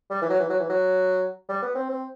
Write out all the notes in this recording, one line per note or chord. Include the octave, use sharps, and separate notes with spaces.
G3
E3
F#3
E3
F#3
E3
F#3
G3
B3
C4
C4